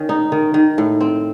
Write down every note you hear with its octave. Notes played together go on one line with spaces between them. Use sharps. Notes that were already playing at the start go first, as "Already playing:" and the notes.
Already playing: D#3 C#4
D#4
D#3
D#3
A2
C4